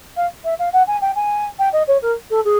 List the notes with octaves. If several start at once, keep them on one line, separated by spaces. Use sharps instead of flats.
F5
E5
F5
F#5
G#5
G5
G#5
G5
D#5
C#5
A#4
A4
G#4